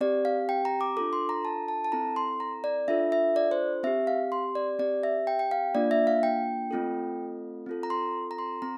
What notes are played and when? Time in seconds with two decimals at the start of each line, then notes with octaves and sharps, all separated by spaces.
0.01 C4 G4 D5
0.25 F5
0.49 G5
0.65 A#5
0.81 D6
0.97 D4 F4 A4 D6
1.13 C6
1.29 A#5
1.45 A5
1.68 A5
1.84 A5
1.92 C4 E4 A4 A#5
2.16 C6
2.40 A#5
2.64 D5
2.88 D4 F4 A4 E5
3.12 E5
3.36 D5
3.51 C5
3.83 C4 G4 E5
4.07 F5
4.32 C6
4.55 D5
4.79 C4 G4 D5
5.03 E5
5.27 G5
5.39 G5
5.51 F5
5.75 A#3 D4 F4 D5
5.91 E5
6.07 F5
6.23 G5
6.71 A3 C4 F4 A4
7.66 C4 F4 A4
7.83 A#5
7.90 C6
8.31 A#5
8.38 C6
8.62 C4 A#5